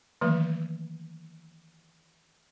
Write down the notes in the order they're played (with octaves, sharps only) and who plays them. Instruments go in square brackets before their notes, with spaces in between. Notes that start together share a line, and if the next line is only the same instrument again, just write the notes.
[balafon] D#3 E3 F#3 A3 A#3